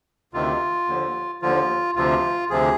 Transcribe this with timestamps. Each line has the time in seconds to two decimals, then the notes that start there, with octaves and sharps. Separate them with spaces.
0.33 D2 C3 D#3 F4
0.88 D#2 D3 F3
1.42 D#2 D3 F3 F4
1.96 D2 C3 F3 F4
2.50 D2 C3 F3 G#4